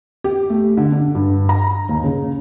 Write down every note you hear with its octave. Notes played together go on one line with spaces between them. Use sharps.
G4
A3
D3
D4
G2
A#5
D#2
C#3